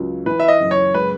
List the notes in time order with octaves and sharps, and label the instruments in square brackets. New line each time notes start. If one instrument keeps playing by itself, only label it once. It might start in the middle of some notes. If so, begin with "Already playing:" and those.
Already playing: [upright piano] C#2 F#3
[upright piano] E3 [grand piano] B4
[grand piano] E5
D#5
[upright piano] F#1
[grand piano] C#5
[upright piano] G#3 [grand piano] B4